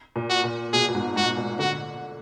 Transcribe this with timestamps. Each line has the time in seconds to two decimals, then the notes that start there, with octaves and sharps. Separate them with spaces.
0.16 A#2
0.29 F#4
0.44 A#2
0.73 B2 G#4
0.89 A#2
0.95 G#2
1.16 G#2 F#4
1.37 A#2
1.59 D3 F#4